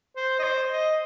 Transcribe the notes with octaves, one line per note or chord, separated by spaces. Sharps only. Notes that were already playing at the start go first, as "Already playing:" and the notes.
C5
D#5
C5
D#5